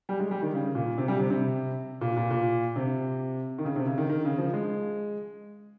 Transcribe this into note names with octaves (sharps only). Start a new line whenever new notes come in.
G3
G#3
G3
D#3
C#3
A#2
C3
G3
C3
C3
A#2
A#2
A#2
C3
D#3
C#3
C3
C#3
D#3
D#3
C#3
F3
G#3